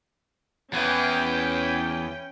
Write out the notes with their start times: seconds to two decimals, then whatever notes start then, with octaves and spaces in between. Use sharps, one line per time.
0.73 E2 E3 C#4 G5